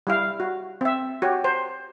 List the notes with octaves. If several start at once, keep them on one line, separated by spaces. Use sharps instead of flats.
G3 E4 F5
F#4
C4 E5
F#4 G4 C#5
C5